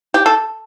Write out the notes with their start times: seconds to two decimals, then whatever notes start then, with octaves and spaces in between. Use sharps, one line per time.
0.14 G4
0.26 A4